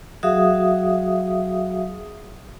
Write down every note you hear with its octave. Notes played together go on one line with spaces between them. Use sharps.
F#3 F#4 G#4 E5 F5 D#6